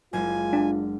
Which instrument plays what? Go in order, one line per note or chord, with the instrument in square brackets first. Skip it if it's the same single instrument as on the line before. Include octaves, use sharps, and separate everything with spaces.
[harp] F#1 G#3 [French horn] F4 [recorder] G#5
[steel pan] D4